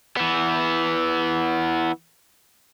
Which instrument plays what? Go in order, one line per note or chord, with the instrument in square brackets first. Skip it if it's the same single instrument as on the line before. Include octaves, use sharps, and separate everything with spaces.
[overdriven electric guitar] E3 B3